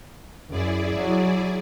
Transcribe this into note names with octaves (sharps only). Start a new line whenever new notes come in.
F#2 E4 G#4 D5
F#3